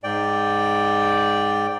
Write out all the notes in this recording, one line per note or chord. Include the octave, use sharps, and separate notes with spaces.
G#2 D5 G5